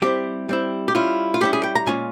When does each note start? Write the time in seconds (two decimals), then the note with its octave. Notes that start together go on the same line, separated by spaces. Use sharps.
0.02 G3 C4 E4 G4
0.49 G3 C4 E4
0.88 G4
0.95 G3 C#4 E4 F4
1.34 F4
1.41 G3 C#4 E4 G4
1.53 G#4
1.63 G5
1.75 A#5
1.86 A#2 G#3 C#4 F4 G#5